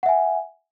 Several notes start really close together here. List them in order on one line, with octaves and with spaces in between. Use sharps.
F#5 E5 G#5